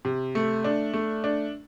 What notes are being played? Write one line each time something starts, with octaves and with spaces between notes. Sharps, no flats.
C3
A3
D4
A3
D4